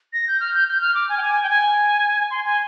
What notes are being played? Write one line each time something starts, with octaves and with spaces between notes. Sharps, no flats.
A#6
G6
F6
G6
G6
F6
D6
G#5
G5
G#5
G5
G#5
C6
G#5